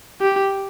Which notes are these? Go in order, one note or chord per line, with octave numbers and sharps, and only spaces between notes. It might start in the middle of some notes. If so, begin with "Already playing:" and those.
G4